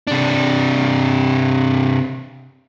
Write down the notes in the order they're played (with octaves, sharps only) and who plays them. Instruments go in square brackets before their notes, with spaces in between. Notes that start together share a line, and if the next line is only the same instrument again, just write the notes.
[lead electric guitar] C3 D4